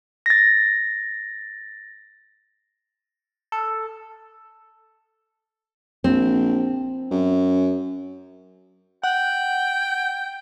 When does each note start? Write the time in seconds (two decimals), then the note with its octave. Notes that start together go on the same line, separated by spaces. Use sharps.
0.26 A6 A#6
3.52 A4
6.04 A#1 C4
7.11 F#2
9.03 F#5 G5